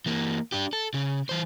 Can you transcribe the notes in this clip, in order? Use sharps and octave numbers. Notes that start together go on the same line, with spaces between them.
E3 A#3
D4 G4
A4
C#3
E3 C5